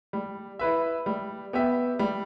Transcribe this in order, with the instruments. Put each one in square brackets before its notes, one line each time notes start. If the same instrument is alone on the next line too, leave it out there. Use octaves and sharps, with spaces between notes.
[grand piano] G3
E4 B4 E5
G3
B3 G4 E5
G3